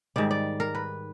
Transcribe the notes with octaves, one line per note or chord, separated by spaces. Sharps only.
G#2 D#3 G3 D5
D5
A#4
B4